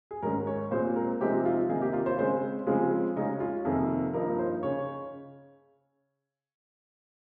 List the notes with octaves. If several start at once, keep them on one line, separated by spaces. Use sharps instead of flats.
G#4
G#2 D#3 G#3 C#4 A#4
C#5
A#2 G#3 C4 C5
A#4
C3 F3 G#3 C4 D#4 G4
F4
C3 D#3 A#3 D#4 G#4
G4
F4
C5
C#3 G#3 C4 C5
C#3 F3 G#3 C4
C#3 G#3 C#4 D#4
F4
F2 C3 D#3 A#3 G#4
G2 F3 A#3 D#4 A#4
C5
C#3 C#5